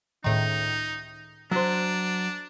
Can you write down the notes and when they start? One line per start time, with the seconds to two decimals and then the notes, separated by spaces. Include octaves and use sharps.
0.24 C#2 A2 D#3 D#4
1.51 F#3 D4 C5